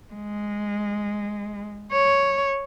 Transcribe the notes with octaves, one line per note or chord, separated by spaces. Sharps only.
G#3
C#5